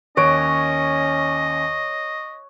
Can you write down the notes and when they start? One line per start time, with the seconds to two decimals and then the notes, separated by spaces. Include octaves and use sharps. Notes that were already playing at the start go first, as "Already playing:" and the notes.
0.17 D#2 C#4 C#5 D#5 F#6 D7